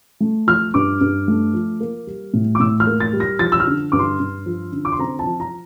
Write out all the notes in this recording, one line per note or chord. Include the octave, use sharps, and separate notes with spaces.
A3
F3 F6
G2 D6
G2
A3
F3
A#3
G3
A2
D6
A2 E6
F6
A#3
A6
G3
A#6
F3 A6
E6
F6
D3
G2 D6
C6
G2
F3
D3
D6
C6
C4 A#5
A5
F3
A#5